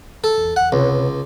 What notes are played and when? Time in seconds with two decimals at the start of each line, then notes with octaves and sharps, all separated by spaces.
0.24 A4
0.38 E2
0.56 F#5
0.72 C#2 C3 B4 C#5